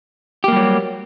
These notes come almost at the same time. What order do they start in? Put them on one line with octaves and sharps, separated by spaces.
G4 A#3 G3 F#3